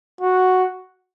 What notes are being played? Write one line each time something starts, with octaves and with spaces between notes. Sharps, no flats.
F#4